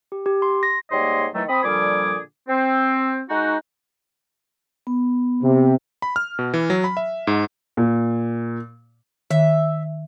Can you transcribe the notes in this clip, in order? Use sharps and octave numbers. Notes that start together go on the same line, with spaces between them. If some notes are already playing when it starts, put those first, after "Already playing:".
G4
G4
C6
A#6
G#2 G3 A#3 C#5 D#5 C6
D#3 E3 F#3 A3
C4 B5 D#6
A#2 D3 F3 G3 G#4 D6
C4
G#3 D#4 F#4
B3
C3
B5
F6
B2
E3
F#3
B5
E5
G#2
A#2
D#3 E5